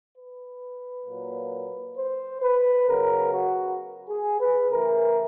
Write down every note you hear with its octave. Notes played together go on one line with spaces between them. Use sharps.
B4
A#2 F#3 A#3
C5
B4
C#3 F#3 B3 A#4
F#4
G#4
B4
C#3 E3 A3 A#4